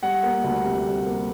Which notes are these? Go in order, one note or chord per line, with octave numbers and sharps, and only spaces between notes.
G3 F#5
A#3
D2
C3
G3
A#3